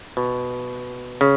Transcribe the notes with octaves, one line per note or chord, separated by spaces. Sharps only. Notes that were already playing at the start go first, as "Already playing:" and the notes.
B2
C#3